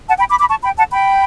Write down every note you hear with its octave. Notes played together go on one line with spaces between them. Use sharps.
F#5 A5
G5 B5
B5 D6
B5 D6
A5 C#6
G5 B5
F#5 A5
G5 B5